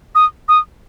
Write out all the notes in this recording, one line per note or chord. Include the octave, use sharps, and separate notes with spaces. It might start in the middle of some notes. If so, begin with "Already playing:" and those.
D#6
D#6